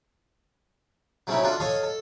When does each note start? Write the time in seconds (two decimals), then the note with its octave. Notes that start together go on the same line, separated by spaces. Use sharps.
1.27 F#3 A3 C4 C#4 D#4 E4
1.43 D4 F4 F#4 A4
1.60 A4 C#5 D#5 F5 A5
1.83 A4